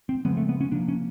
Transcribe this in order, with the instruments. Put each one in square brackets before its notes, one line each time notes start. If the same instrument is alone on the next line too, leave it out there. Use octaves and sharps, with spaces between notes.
[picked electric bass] C4
[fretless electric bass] C#3 F3 G#3 C4 [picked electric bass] B3
[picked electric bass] A3
B3
C#4
[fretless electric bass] C3 F3 A#3 [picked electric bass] D4
[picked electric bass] C#4